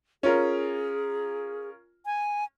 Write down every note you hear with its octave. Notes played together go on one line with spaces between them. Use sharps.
C#4 F4 G#4 A#4
G#5